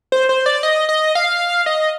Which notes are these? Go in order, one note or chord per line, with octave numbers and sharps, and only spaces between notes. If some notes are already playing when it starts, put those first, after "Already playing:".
C5
C5
D5
D#5
D#5
F5
D#5